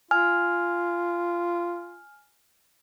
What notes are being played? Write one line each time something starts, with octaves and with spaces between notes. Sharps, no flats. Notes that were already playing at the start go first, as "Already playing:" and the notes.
F4 G#5 F6